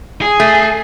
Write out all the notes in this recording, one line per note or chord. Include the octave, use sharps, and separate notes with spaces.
G#4
A3